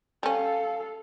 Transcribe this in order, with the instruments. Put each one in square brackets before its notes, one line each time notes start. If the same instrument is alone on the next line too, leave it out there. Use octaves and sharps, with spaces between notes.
[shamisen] G3 C#4 [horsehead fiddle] A4 F5